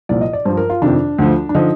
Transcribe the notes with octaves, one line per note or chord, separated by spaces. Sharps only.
C2 A#2 F3 D5
D#5
D5
G2 F3 C5
A#4
F4
F2 C3 D#3 D4
D2 D3 F3
D4
D3 F3 D#4